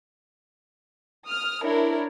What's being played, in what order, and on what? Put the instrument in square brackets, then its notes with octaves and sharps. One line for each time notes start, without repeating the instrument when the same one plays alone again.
[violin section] D#6 F6
D4 E4 A#4 C#5